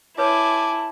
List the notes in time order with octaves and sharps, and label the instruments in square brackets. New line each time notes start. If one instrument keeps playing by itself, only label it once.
[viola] E4 [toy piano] B4 C#5 [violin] G#5 D6 [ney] A5